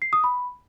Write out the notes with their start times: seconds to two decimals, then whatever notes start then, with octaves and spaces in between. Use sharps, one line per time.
0.02 C7
0.13 D#6
0.24 B5